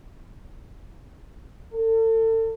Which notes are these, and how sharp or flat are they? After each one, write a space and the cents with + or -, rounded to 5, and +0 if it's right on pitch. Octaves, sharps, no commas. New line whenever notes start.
A4 +35